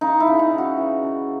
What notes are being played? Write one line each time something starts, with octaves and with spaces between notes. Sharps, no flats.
C#3 D#4
E4
C#3
D#4
C#3
F#4
E3
C#3